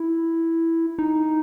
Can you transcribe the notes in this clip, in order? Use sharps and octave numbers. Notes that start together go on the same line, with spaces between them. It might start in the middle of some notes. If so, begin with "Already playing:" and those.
Already playing: E4
D#4